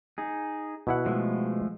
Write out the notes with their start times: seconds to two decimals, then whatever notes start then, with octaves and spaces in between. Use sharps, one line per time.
0.18 D#4 G#4
0.87 B2 E4 F#5
1.06 F3 G#3 A3